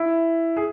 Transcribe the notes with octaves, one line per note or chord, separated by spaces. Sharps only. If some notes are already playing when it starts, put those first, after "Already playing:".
Already playing: E4
G#4